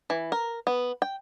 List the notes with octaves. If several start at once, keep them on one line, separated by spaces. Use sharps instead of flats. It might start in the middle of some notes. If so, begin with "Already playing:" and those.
E3
A#4
B3
G5